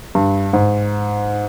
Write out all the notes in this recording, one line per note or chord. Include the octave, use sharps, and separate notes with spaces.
G2
G#2